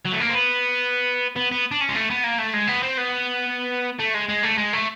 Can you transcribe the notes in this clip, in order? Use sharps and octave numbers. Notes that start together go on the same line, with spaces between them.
F#3
A3
A#3
C4
B3
B3
B3
D4
C#4
G#3
A3
B3
A#3
A3
G#3
B3
C4
B3
A3
G#3
G#3
A3
G#3
A3